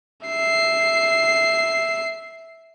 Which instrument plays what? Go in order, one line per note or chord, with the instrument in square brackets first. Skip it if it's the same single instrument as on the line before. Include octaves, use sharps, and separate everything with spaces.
[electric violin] E5 C7